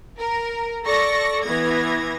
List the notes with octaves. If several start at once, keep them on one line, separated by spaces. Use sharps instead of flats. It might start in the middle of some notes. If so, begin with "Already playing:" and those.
A#4
A4 D5 C#6 A#6
E3 B3 G#6 A#6